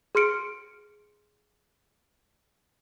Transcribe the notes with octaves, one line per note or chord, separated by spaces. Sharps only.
G#4 C6 F6 C#7 D7